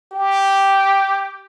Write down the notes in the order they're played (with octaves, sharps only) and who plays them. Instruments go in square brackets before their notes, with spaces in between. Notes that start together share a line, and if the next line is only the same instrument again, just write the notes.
[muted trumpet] G4